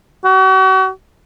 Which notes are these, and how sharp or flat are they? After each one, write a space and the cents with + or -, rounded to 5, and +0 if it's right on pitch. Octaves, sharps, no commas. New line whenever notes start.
F#4 +40